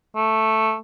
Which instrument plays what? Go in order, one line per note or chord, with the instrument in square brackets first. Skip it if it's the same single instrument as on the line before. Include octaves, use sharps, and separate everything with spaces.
[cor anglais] A3